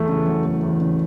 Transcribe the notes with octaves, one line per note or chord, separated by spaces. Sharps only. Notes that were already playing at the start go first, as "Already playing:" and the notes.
Already playing: E2 A3
C#3
F#3
A3
E2
C#3